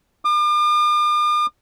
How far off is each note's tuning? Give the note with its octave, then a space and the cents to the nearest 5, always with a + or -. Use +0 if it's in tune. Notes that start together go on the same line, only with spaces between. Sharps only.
D6 +45